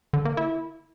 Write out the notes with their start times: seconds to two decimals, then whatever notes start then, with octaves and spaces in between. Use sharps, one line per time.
0.13 D3
0.25 A#3
0.37 E4